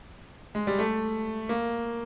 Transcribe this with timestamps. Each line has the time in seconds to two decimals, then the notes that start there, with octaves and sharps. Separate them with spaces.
0.55 G#3
0.67 G3
0.79 A3
1.49 A#3